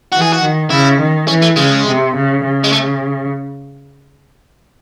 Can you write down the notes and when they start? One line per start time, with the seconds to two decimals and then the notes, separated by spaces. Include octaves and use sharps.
0.12 E3 F#4
0.22 G#4
0.33 F#4
0.41 D#3
0.70 C#3 E4
0.99 D#3
1.28 E3 C#4
1.42 A3
1.57 C#3 G#3
1.86 C3
2.14 C#3
2.43 C#3
2.64 G#3
2.72 A3